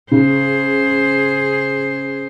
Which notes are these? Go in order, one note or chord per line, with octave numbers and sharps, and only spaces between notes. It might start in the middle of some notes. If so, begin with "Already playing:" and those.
C#3 G#4 C5